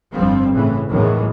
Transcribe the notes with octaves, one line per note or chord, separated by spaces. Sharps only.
G1 F2 F3 G3 C4
A2 C#3 E3
E2 A2 D#3 E3 F#3 G#3